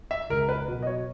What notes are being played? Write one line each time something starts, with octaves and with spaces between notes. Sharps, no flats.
E5
C#2 A#4
B4
B2 F#3
D#5
C#5